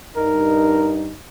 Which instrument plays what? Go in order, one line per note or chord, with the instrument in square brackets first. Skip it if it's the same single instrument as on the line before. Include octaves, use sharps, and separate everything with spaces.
[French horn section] G2 D#4 [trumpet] A#4